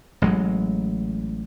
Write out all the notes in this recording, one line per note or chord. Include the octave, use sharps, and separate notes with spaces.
A1 F#3 G#3